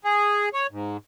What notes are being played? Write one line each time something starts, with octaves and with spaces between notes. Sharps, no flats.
G#4
C#5
G#2